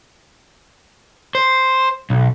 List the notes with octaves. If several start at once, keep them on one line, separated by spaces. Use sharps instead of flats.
C5
B1